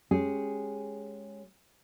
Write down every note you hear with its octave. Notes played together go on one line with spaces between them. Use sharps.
G#3 C#4 G4 G#4